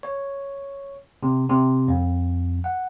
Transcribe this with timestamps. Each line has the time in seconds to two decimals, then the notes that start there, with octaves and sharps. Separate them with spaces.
0.03 C#5
1.23 C3
1.50 C3
1.88 F2
2.64 F#5